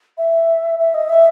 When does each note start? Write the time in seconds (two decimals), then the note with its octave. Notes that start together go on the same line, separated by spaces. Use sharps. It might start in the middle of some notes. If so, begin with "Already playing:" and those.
0.18 E5
0.80 E5
0.94 D#5
1.09 E5